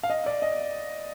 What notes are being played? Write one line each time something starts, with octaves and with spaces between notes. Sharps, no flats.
F5
D#5
D5
D#5